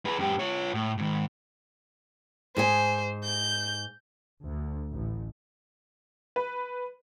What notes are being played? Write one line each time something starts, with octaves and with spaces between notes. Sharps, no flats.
G#4 B4
F#2 G4
F4 C#5
A2
G#2 D#3
G#2 G#4 C5 G#5
G6
D2
A1
B4